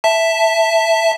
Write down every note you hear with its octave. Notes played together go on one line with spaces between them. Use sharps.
E5 A5